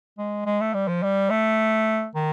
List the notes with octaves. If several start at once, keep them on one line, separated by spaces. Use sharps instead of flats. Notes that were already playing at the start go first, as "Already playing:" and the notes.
G#3
G#3
A3
G3
F3
G3
A3
D#3